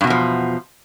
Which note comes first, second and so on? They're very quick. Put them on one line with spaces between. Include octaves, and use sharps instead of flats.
G2 B2 E2 F3